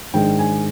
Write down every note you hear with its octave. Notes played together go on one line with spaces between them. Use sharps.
G#2 D#3 G#3 D4 G5
G#5